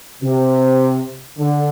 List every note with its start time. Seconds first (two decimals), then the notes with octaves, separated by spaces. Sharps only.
0.23 C3
1.39 D3